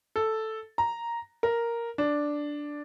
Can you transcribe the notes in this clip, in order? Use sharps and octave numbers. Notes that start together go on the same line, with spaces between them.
A4
A#5
A#4
D4